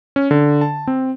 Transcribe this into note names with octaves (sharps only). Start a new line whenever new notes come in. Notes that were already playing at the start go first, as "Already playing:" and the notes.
C#4
D3
A5
C4